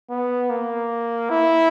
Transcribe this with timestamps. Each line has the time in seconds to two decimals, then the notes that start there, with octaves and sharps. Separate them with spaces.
0.10 B3
0.50 A#3
1.30 E4